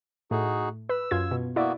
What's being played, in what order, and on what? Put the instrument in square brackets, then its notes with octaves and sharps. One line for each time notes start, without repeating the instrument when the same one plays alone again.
[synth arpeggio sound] A2 [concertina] D#4 F#4 G#4
[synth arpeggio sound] B4 [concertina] E6
[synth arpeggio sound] F#2 F4 G#6
B2
[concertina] A#3 B3 F#4 [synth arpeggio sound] E4 D5